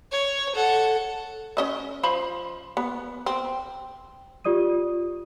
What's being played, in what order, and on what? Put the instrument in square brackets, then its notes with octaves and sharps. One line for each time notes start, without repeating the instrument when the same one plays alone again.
[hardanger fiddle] C#5
A4 F#5
[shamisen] C#4 D#5 E5
F3 C5 B5
B3
C4
[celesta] F4 G4 D5 D#6 D#7